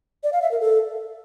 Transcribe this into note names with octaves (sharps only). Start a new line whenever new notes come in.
D5
F5
E5
A#4
A4